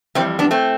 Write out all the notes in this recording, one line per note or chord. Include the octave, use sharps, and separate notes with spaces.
F2 E3 G3 A3 C4
B3 D4
A3 C4